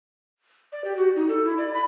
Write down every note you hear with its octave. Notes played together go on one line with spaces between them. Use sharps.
D5
G4
F#4
D#4
A4
E4
D5
B5